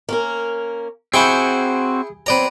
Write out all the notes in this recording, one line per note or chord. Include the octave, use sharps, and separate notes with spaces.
A#3 C#4 A#4
C4 E4 F#4 G#4 G5 C#6
F#3 C4 B4 D5 A#5